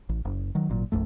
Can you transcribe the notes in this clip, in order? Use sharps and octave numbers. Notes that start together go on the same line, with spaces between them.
A1
F#1
D#3 F#3
G#1 A#2 F#3
D1 A#1 F#2 A3